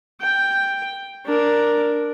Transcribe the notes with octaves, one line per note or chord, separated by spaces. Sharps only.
G5
D4 A#4